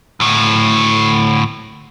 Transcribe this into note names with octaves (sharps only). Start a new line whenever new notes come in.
D2 A2